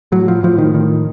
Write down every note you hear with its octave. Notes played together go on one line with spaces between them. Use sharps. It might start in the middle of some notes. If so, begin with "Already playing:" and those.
A2 F#3
F3
A2 F3
D#3
A2 D#3